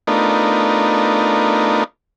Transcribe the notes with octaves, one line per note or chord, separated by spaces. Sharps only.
A3 B3 D4 D#4 F4 A#4